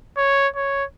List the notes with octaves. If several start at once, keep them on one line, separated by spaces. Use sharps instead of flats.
C#5
C#5